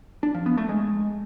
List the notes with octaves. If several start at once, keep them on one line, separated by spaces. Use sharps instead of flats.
D4
F3
B3
A3
G#3